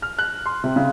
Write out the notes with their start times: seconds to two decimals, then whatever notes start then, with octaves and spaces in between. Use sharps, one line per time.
0.02 F6
0.19 F#6
0.46 C6
0.64 C3
0.76 C#3